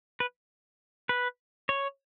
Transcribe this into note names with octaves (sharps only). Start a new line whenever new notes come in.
B4
B4
C#5